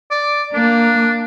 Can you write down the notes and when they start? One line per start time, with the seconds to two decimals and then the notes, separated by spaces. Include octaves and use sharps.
0.11 D5
0.54 A#3 D4